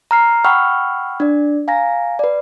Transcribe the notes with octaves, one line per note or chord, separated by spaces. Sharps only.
A#5 F6 C7
F#5 G5 B5 C#6 E6 F6
D4 D5
F5 G#5 A#5 A#6
B4 D5